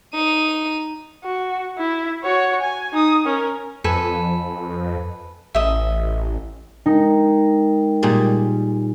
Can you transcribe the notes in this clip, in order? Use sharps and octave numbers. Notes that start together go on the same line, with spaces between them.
D#4 D#7
F#4
E4
F#4 C#5
G#5
D#4 D#6
C#4 A#4
F2 A4 B4 G#5
A1 D#5 E5
G#3 D#4 A#4 G5
A#2 G3 G#4